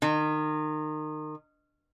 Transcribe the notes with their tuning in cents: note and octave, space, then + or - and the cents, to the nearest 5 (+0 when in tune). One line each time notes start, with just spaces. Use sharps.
D#3 -25